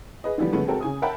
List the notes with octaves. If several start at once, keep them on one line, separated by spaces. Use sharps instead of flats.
G#4 B4 D#5
D3 E3 F3 G3 B3
C#3 F3 G#3 A3 B3
G#3 C4 F#4 A4 A#4
C#3 G#5 D#6
A#4 E5 F#5 G5 A5 B5